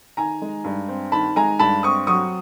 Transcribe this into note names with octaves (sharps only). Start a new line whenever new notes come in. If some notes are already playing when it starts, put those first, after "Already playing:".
D#3 G#5 A#5
G#3
G2
C4
D#3 A5 B5
G#3 G#5 A#5
G2 A5 B5
C4 C#6 D#6
F#3 C#6 D#6